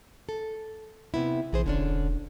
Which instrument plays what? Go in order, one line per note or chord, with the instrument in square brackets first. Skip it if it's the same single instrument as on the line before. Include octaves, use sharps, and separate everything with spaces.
[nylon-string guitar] A4
C3 B3 E4
[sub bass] A#1 [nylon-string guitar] E3 G#4 C5
[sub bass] E1 [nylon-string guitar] D3 C#4 D4